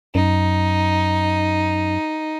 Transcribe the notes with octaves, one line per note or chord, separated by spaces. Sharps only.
F#2 D#4